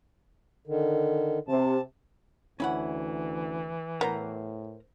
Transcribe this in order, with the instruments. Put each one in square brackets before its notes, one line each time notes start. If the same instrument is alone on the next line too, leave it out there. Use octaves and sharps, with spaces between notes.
[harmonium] D3 D#3
[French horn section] C3 [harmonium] A5
[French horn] D2 [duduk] E3 [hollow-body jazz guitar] C#4 E4 F#5
[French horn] A2 [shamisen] B3 [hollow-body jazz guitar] A#4 C5 A#5